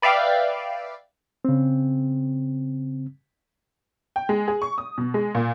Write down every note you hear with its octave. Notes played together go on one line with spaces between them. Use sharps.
B4 D5 E5 F5 G5
C#3 C4
G5
G#3
G#4
C#6
D#6
B2
G#3
A#2